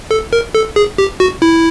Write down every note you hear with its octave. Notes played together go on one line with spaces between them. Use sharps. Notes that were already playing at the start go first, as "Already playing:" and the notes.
A4
A#4
A4
G#4
G4
F#4
E4